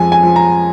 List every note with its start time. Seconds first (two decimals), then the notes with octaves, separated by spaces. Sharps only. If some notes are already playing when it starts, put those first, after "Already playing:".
Already playing: F2 G#3 G#5
0.12 G#5
0.23 F3
0.36 A#5